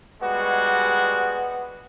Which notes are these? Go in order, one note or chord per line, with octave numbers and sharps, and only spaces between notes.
G3 G#3 B3 F#4